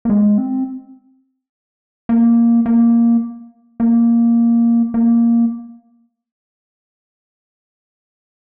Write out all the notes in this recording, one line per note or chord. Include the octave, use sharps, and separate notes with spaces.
A#3
G#3
C4
A#3
A#3
A#3
A#3